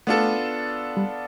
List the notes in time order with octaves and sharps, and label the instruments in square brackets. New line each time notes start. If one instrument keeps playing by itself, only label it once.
[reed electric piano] A3 [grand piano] B3 D4 F4 A4
[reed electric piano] G3